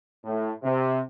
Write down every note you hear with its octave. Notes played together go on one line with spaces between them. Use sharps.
A2
C3